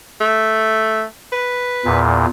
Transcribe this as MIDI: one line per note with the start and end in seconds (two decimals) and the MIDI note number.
0.21 1.03 57
1.32 1.99 71
1.85 2.26 40
1.85 2.26 46